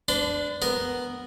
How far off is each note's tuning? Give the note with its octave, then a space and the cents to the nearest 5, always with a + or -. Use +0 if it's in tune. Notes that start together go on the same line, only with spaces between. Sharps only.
D4 +0 B4 +45
B3 +0 A#4 +0